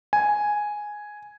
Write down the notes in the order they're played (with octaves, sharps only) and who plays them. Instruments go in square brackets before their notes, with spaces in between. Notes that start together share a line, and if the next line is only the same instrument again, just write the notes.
[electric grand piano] G#5